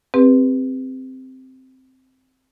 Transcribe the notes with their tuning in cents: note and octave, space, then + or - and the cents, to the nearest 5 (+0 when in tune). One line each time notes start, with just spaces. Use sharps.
C4 -5 G4 +30 B4 +0